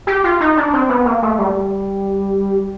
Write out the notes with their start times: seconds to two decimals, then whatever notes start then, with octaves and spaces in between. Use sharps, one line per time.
0.07 G4
0.24 F4
0.41 D#4
0.57 D4
0.73 C4
0.89 B3
1.05 A#3
1.22 A3
1.39 G3